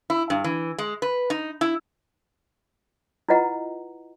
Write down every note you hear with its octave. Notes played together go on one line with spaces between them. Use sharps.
E4
G2
E3
G#3
B4
D#4
E4
E4 F4 B4 D#5 F#5 A#5